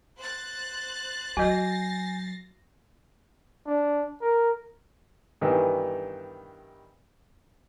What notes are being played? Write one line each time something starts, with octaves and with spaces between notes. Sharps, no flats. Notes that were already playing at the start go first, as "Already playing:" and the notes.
C5 F#6 A6
F#3 F#4 D#5 G#5 G6 A6 A#6 C7
D4
A#4
G2 D#3 E3 G3 B3